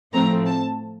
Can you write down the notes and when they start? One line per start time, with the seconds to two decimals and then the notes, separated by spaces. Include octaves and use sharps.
0.13 A2 F3 A3 C4 A#5
0.46 A5